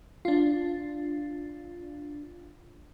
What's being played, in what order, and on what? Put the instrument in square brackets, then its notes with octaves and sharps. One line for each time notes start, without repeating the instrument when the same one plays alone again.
[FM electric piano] D4 F4